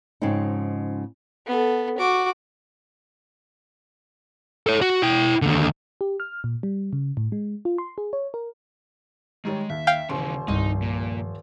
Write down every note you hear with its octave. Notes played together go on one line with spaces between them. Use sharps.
G#2 C#3 F3 C4 D#4
B3 A4
F#4 D6
A4 C#5
F#4
E4 G5
D#2 D3
G4
F6
A#2
G3
C#3
A2
G#3
F4
C6
G#4
C#5
A#4
D#3 G3 G#3 C#5
D#2 E5
F5 G5
D#1 C#3 E3 C5 C6
C2 G2 F3 D#4
A#2